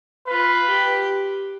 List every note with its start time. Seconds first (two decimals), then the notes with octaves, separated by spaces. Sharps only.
0.28 F4 B4
0.68 G4